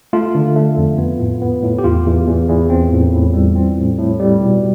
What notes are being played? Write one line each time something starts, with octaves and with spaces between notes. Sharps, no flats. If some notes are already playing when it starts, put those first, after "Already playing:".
A3 F4
D3
A3
F2
B3
A2
B3
A2
G4
E2 F4
E2
E2
E2
C4
A2
A2
G3
C4
A2
A2
G3
B2